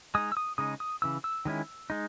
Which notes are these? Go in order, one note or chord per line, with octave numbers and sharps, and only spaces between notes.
G#3 D#4 D#6
E6
D#6
C#3 G#3 D#4 D#6
D#6
C#3 E3 E6
E6
D#3 G#3 C#4 E4
G#3 D#4